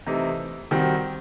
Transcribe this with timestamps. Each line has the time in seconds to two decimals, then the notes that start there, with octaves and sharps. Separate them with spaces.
0.06 C3 E3 A3 D#4
0.71 D#3 G3 C4 F#4